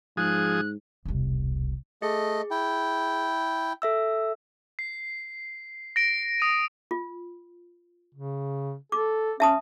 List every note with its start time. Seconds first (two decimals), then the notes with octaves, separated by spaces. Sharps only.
0.17 G#2 F3 G#4 D#6 F#6
1.05 E1 C2
2.02 A3 G#4 D#5
2.51 E4 G5
3.82 A4 E5 E6
4.79 C7
5.96 A#6 D7
6.40 D#6 D#7
6.91 F4
8.15 C#3
8.92 A4 D6
9.40 C#4 E5 A5 D#6